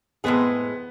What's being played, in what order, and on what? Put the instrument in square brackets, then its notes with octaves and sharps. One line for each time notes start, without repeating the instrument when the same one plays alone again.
[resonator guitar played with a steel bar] A2 G#3 C4 G#4 [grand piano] B3